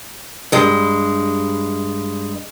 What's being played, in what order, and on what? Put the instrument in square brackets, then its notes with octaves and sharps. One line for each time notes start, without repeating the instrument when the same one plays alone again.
[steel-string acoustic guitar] G2 G#3